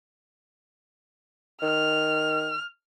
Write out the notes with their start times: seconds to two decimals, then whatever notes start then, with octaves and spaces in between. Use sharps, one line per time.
1.62 D#3 F6